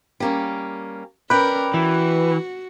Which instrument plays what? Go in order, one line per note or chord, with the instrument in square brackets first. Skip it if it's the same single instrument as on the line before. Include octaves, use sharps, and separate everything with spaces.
[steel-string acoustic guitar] G3 A#3 C#4
[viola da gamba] C#4 A#4 [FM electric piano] B4 [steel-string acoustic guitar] D5 G5
[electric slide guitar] E3 [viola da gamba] F#4